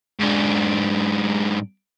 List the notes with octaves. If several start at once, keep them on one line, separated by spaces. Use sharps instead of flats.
G#2 D4